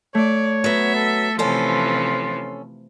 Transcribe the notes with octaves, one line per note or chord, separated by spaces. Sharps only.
A3 C#5 D5
F#3 B3 E5
A4
C3 E3 F3 C#4 A4 C6